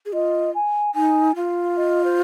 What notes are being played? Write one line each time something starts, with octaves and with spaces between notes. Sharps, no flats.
G#4
F4 D#5
G#5
D#4 G#5
F4 F5
D#5
C5